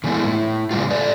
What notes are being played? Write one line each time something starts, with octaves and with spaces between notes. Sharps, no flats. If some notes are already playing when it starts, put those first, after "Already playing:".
D3 E3 G#3 A3 B3 E4
A2 E4
G#2 C#3 G3 G#3 B3 F4
A4 B4 D5